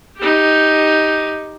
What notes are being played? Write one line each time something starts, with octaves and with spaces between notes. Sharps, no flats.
D#4 G4